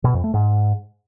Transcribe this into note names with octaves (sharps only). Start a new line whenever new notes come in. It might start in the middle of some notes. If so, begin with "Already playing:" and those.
B2
F2
A3
G#2